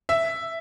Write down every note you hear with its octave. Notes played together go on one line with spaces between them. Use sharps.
E5